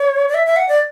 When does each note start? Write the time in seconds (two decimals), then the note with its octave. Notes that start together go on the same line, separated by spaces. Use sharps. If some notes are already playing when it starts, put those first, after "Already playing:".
Already playing: C#5
0.28 D5
0.34 E5
0.47 E5
0.56 F#5
0.69 D5